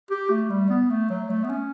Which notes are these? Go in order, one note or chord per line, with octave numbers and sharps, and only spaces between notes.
G4
A3
G3
B3
A3
F#3
A3
B3
C#4